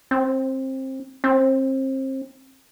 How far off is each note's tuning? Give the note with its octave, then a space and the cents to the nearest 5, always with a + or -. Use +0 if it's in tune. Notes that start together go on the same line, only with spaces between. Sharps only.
C4 +20
C4 +30